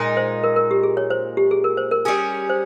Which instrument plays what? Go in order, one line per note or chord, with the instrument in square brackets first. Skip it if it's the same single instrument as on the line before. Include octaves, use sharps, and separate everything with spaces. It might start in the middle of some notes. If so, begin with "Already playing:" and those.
Already playing: [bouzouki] A#2 G#3 D#4
[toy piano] C5
A#4
A#4
G4
G#4
C#5
C5
G4
G#4
A#4
C5
A#4
[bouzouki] G3 C#4 G#4
[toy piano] C5